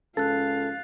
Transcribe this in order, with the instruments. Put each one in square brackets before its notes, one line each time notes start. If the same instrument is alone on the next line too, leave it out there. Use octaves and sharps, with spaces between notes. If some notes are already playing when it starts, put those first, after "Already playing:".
[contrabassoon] C#2 [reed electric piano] A4 [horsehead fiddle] F5 [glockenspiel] F#6 A6